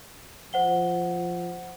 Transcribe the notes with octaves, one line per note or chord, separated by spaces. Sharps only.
F3 C5 F#5 G7